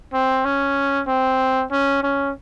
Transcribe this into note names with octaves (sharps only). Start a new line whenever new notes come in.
C4
C#4
C4
C#4
C#4